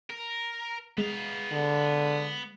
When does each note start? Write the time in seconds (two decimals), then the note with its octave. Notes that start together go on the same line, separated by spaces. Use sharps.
0.10 A#4
0.98 G#3 B3 F5
1.52 D3